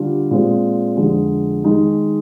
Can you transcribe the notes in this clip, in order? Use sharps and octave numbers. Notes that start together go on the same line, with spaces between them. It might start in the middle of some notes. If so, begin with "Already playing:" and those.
Already playing: D3 G3 D4 F4
A#2 G#3 C4
F2 D3 G#3
D#3 G#3 D#4